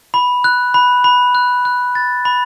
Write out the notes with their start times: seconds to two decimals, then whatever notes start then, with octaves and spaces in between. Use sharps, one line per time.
0.14 B5
0.44 F#6
0.74 B5
1.04 B5
1.35 F#6
1.65 F#6
1.95 A6
2.25 B5